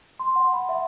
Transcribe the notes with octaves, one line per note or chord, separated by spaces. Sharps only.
C6
F#5
B5
E5